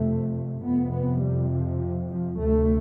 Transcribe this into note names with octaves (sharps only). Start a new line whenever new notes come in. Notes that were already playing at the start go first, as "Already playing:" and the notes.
Already playing: F2 C3 A3
F2 C3 B3
B3
G3
F3
F3
D2 C3 A3